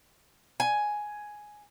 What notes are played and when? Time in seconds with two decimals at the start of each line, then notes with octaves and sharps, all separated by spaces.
0.60 G#5